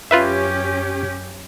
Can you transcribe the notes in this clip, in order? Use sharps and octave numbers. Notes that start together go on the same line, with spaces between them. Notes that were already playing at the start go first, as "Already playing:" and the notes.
F#2 C#4 F4 G4 B4 E5